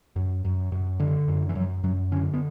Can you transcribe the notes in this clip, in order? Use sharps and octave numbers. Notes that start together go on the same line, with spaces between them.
F#2
F#2
F#2
D3
F#2
E3
F#2 F#3
F#2 F#3
D3 C#4
B3